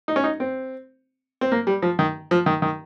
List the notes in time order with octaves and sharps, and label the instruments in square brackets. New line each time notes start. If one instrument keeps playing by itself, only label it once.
[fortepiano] D#4
C#4
D#4
C4
C4
A#3
G3
F3
D#3
F3
D#3
D#3